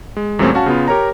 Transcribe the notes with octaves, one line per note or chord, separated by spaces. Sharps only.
G#3
E2 A#2 G3 A3 C4 C#4
C#4 F#4 F5 A5
C#3 B3 F4
G4 A#4 C#5 A#5